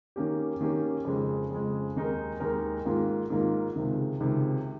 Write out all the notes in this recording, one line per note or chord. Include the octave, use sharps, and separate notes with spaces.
D#3 A#3 C#4 G4
D#3 A#3 C#4 G4
F2 C#3 G#3
F2 C#3 G#3
D#2 D#3 G#3 D#4 A#4
D#2 D#3 G#3 D#4 A#4
G#2 D#3 A#3 F4
G#2 D#3 A#3 F4
C#2 C3 D#3
C#2 C3 D#3